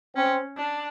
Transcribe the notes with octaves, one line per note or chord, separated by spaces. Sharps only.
C4 C#4
D4